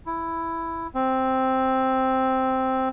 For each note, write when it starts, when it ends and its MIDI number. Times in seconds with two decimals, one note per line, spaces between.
0.06 0.87 64
0.95 2.89 60